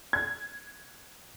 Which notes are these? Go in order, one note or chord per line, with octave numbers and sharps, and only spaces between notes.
G#6